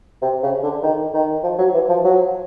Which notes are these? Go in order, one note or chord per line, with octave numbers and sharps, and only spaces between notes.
C3
C#3
D3
D#3
D#3
F3
F#3
E3
F3
F#3